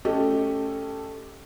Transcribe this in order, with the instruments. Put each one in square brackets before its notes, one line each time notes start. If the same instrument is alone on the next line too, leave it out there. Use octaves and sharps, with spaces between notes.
[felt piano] A3 C#4 G4 A4 D#5